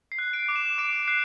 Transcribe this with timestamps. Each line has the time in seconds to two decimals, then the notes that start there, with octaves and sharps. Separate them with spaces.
0.12 C7
0.19 F#6
0.33 D7
0.48 D6
0.56 E7
0.78 D6 D7
1.07 F#6 C7